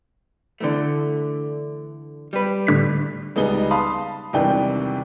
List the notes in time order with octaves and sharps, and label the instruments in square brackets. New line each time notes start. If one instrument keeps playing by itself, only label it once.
[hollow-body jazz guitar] D3 E3 A3
G3 B4
[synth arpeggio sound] A2 D3 B6
[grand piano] C#2 G3 B3 D#4 G#4 G7
F5 A5 B5 C6 D#6
G#1 E2 G2 C3 D5 G5